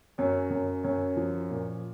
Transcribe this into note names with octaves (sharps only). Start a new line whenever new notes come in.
F#2 C#4
F#2
F#2 C#4
F3
A#2